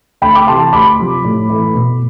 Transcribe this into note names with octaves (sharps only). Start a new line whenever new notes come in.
D2 G5 B5
D6
C3 E3 A5 C6
D2 B5 D6
C3 F3
A2
E3 A3
B2